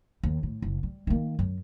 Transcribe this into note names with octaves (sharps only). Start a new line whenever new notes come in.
D#2
A2
F#1
G3
D#3 A#3
F#2